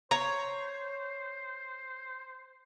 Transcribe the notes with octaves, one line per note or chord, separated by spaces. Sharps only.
C5 C#5 A#5